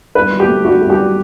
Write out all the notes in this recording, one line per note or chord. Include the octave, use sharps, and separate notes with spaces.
G2 B4
F#3
G4
A3
G2 F#4
G2
G4
F#3